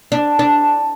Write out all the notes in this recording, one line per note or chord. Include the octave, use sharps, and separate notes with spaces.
D4
D4